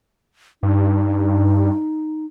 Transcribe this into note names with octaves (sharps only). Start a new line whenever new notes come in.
G2 D#4